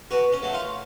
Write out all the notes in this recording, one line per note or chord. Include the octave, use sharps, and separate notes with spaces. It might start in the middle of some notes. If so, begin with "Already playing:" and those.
B2 F#4
C#4
F#3 A3
F4